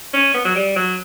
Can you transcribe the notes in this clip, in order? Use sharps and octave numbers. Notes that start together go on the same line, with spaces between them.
C#4
B3
F#3
G3
F#3